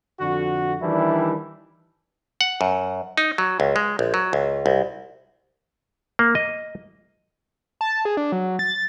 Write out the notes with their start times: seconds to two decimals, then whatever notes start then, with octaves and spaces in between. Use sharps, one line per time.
0.20 F2 D3 F#4
0.82 D#3 E3 G3 D4 E4
2.41 F#5
2.61 F#2
3.18 D#4
3.38 F#3
3.60 C#2
3.76 G#3
3.99 A#1
4.14 F#3
4.33 C#2
4.66 C2
6.19 A#3
6.35 D#5
7.81 A5
8.05 G#4
8.17 D4
8.32 F#3
8.59 A6